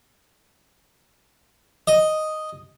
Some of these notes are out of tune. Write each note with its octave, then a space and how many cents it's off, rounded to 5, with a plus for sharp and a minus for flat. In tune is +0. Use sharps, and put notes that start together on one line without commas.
D#5 +0